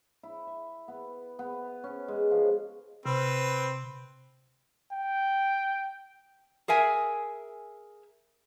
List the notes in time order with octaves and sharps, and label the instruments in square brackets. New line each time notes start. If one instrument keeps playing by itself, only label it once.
[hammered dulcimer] E4
E5
B3
B3
C#4
G#3
F3
[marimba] C3 [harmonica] C4 B4
[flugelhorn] G5
[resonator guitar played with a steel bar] G#4 A#4 E5 G#5